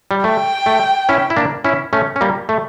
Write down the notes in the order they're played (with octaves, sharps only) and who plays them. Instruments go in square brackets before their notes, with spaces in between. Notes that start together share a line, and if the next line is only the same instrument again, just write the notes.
[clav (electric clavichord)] G3
[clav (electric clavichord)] A3 [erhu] G5
[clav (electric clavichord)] A3
C#4 E4
E4
A#3 D4
C#4 E4
A3 C#4
C#4
G3 A#3
A3